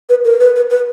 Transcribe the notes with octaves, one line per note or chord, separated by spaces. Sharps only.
B4
A#4
B4
B4
B4